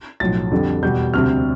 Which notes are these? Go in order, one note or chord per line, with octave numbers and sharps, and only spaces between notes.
B1 A2 F3 A6
F2 D3 G3
E2 B2 G3 G6
D2 C3 G3 C4 F6